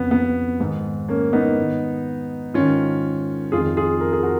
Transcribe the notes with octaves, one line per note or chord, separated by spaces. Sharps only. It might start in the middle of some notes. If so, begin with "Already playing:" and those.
Already playing: F2 C#3 B3
B3
G#2 D#3
A#3 C#4
B3 D#4
G#2 D#3
G#2 D#3 C#4 F4
F2 D#3 F4 G#4
F4 G#4
A#4
G#4
F#4 A#4